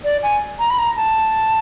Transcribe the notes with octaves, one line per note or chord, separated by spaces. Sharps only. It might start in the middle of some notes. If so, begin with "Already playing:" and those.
D5
G#5
A#5
B5
A#5
A5